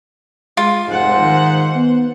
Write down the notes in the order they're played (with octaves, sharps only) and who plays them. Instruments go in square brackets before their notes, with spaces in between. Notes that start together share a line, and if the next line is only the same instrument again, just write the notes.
[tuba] G#3 [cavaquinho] F4
[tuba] F1 [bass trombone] G#2 [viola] C5 F#5
[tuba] D#3
B3